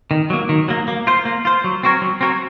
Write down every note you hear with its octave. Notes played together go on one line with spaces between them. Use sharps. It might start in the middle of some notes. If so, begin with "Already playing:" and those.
D#3
F#3 A#3
D#3
F#3 A#3
A#3
F4 C5
A#3
F4 C5
F#3
C4 F#4 A#4 C#5
F#3
C4 F#4 A#4 C#5